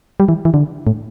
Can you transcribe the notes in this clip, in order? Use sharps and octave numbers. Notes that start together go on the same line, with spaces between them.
G3
E3
E3
D3
A2